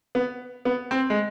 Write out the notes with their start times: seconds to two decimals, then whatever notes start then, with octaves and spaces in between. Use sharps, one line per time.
0.15 B3
0.65 B3
0.91 C4
1.10 G#3